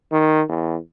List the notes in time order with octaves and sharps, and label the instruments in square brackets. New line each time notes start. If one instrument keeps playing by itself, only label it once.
[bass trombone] D#3
E2